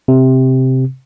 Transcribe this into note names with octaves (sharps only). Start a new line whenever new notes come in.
C3